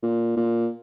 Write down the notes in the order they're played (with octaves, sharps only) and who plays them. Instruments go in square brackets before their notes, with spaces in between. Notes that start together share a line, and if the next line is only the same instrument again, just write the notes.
[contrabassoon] A#2
A#2